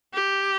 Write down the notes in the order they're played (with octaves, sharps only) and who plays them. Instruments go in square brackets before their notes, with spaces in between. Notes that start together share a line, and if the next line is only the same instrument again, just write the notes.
[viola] G4